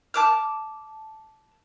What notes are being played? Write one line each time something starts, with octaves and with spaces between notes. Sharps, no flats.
A5 D6 F6